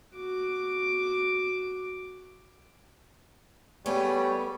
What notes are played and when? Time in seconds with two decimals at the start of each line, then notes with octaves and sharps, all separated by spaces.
0.14 F#4 D6
3.86 G3 A3 B3 G#4 C#5